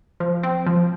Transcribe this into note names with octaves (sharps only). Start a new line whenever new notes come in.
F3
C4
F3